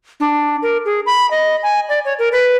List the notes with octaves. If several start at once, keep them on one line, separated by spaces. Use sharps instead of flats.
D4
A#4
G#4
B5
D#5
G#5
D5
C#5
A#4
B4